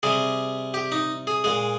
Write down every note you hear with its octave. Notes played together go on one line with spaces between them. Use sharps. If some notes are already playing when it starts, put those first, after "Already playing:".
C3 G3 G#4
G4
D#4
G#4
A#2 G#3 G#4